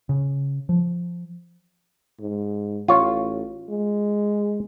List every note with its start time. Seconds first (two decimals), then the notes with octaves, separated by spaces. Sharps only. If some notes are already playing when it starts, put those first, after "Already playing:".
0.09 C#3
0.69 F3
2.20 G#2
2.88 A1 F4 C#5
3.70 G#3